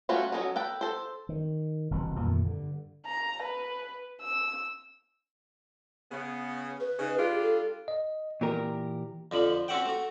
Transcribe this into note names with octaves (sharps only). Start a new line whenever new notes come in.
G3 A3 C#4 F4 F#4
F#3 C4 C#4 A4 D#5
A4 B4 G5
A4 C5
D#3
F#1 C2 B2 E3
F2 A#2 D#3 A3
G2 D3
A#5
B4
E6
C#3 B3
B4
C#3 D#4
G3 D4 F4 G#4
A4
D#5
A#2 E3 G4 A#4
F2 D3 F3 B5
C4 C#4 F#4 E5 F#5 G5
A3 F#4